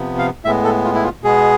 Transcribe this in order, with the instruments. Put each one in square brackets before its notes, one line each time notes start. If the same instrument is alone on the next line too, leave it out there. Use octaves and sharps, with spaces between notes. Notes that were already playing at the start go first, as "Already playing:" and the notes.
Already playing: [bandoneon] C3 F3 B3
F5
A2 G#3 B3 E5
A4
F4
E4
F4
B2 G#3 B3 G#4